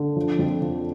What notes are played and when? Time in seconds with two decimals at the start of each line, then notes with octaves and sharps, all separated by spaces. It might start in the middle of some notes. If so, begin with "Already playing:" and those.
Already playing: D3
0.16 F3
0.39 F2
0.62 F3